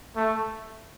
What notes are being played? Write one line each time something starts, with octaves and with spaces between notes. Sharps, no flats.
A3